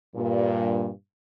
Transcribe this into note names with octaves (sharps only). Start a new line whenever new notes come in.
G2 A#2